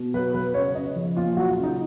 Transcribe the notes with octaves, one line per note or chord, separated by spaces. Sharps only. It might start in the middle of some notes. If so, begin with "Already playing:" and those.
Already playing: B2
F#3 B4
F#3 B4
C#3 C#5
C#3 D#5
F3
A#2 F4
F#3 F#4
F4
C#3
D#4